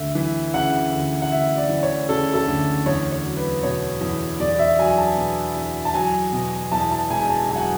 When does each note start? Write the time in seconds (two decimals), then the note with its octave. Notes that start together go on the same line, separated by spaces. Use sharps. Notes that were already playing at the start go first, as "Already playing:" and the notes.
Already playing: D2 E5
0.15 E3
0.54 C#3 F#5
0.92 D2
1.22 F#5
1.31 D2 E5
1.57 D5
1.69 E3
1.83 C#5
2.09 C#3 A4
2.34 A4
2.47 D2
2.86 E2 C#5
3.11 C#5
3.24 F#3
3.37 B4
3.63 B2 C#5
4.01 E2
4.40 E2 D5
4.59 E5
4.79 F#3 G#5
4.97 A5
5.17 B2
5.56 E2
5.85 A5
5.94 F#3 G#5
6.33 B2
6.72 E2 A5
6.91 A5
7.10 E1 G#5
7.29 A5
7.49 F#3 G#5
7.56 F#5